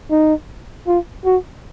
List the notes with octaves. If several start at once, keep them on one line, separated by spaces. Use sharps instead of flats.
D#4
F4
F#4